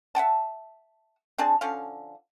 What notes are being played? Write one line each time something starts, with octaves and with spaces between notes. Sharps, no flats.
E5 F#5 G5 A5
C4 D4 G#4 A5
D3 F3 C#4 F5